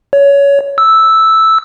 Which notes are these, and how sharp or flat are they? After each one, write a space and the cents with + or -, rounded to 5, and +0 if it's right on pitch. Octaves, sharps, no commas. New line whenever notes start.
C#5 +20
E6 -5